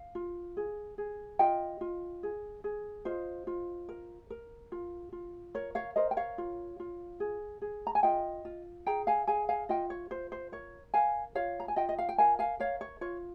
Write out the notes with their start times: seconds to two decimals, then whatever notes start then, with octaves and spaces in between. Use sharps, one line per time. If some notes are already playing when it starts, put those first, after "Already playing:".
Already playing: F5
0.15 F4
0.57 G#4
0.98 G#4
1.39 F4 D#5 G5
1.81 F4
2.23 G#4
2.64 G#4
3.05 F4 C5 D#5
3.47 F4
3.89 A#4
4.30 A#4
4.72 F4
5.12 F4
5.55 A#4 C#5
5.75 C#5 F5
5.96 A#4 C5 D#5
6.11 G5
6.17 C#5 F5
6.38 F4
6.80 F4
7.20 G#4
7.61 G#4
7.87 A#5
7.95 G#5
8.03 F4 D#5 G5
8.45 F4
8.86 G#4 G5 A#5
9.07 F5 G#5
9.27 G#4 F5 G#5
9.49 F5 G#5
9.69 F4 D#5 G5
9.90 C#5
10.11 F4 C5
10.32 C5
10.52 A#4 C#5
10.94 A#4 F5 G#5
11.35 F4 C#5 F5
11.60 A#5
11.68 G#5
11.76 F4 D#5 G5
11.89 D#5
11.98 F5
12.09 G5
12.18 A#4 F5 G#5
12.39 F5 G#5
12.60 A#4 C#5 F5
12.81 C#5
13.01 F4 C#5